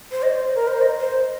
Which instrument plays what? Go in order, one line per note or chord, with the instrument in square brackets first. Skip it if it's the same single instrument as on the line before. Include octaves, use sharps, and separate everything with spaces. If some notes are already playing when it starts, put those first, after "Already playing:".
[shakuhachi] C5
D#5
C5
A#4
C5
D#5
C5